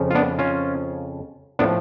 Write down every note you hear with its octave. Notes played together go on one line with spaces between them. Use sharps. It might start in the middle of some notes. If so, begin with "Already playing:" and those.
Already playing: F2 C#3 F3
F4
B3 D4
C#4 F4
A2 F3 B3 D4